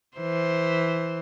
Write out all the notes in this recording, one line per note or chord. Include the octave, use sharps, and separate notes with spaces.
E3 C5